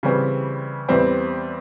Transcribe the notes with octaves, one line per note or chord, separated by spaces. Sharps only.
C#3 E3 G3 C4
E2 E3 G3 C4 E4